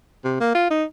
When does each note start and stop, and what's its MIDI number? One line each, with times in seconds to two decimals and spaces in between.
0.24 0.37 48
0.40 0.51 58
0.55 0.67 65
0.71 0.84 63